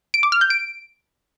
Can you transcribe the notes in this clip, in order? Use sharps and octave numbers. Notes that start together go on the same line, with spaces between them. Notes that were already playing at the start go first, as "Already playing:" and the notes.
D7
D6
F6
G6
D7